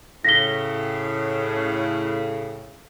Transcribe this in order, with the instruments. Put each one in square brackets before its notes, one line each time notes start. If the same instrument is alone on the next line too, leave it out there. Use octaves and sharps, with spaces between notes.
[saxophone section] A2 C#3 [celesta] A#6 B6 G7